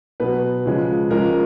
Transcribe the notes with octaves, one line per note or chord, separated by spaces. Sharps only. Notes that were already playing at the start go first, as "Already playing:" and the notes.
B2 F#3 B4
C#3 F3 G#3
C#3 F3 G#3 A#4